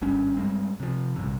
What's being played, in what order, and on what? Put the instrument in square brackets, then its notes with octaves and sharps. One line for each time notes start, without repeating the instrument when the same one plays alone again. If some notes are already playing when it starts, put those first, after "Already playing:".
[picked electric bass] G#1 G2 C#4
G2 G3 G#3 C4
C3 F3
A#1 G2 C3